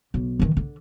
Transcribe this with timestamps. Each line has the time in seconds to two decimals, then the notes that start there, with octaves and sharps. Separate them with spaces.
0.14 B1
0.39 D#3 E3
0.57 D3